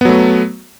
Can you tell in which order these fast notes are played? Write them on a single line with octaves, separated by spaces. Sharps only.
B3 F#3 A3